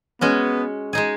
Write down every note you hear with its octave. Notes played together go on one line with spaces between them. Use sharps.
G#3 B3 C#4 F#4
G#3 D#4 G#4